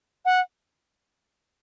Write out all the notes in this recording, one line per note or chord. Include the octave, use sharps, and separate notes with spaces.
F#5